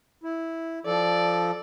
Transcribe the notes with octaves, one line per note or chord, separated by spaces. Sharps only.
E4
F3 A4 D5